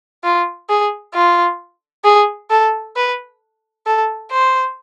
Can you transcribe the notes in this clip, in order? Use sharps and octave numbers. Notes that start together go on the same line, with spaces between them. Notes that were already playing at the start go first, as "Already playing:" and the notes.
F4
G#4
F4
G#4
A4
B4
A4
C5